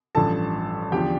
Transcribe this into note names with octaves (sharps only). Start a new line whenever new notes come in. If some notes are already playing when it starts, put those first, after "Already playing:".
A1 G2 F3 A4 A5
E2 D3 F3 G4 G5